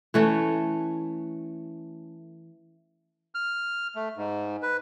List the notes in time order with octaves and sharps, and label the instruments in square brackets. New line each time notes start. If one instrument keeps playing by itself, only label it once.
[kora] E3 A3 C#4
[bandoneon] F6
A3
G#2
B4